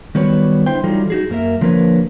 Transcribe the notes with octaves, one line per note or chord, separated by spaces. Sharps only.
D#3 F#3 G3 B3 B4 C#5
D3 E4 C5 G5
E3 F#3 G3 D#4 F4 A4
D#4 F#4 G#4
F#2 A#3 A#4 E5
D3 F3 A#3 A#4 B4 C#5